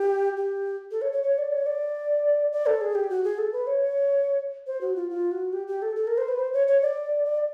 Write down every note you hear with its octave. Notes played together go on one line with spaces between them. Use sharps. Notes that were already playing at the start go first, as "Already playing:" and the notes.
Already playing: G4
G4
A4
C#5
C#5
C#5
D5
C#5
D5
D5
A4
G#4
G4
F#4
G#4
A4
B4
C#5
C5
F#4
F4
F4
F#4
G4
G4
A4
A4
A#4
C5
B4
C5
C#5
C#5
D5
D5